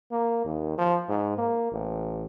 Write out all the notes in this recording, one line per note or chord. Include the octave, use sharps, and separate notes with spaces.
A#3
D#2
F3
G#2
A#3
A1